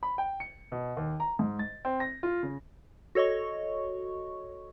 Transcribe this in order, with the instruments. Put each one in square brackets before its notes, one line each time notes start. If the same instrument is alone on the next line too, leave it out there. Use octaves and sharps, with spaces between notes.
[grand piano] B5
G5
C#7
B2
D#2
A#5
G#2
A6
C4
A#6
F4
C#3
[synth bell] F#4 A4 C#5 D#5 C#6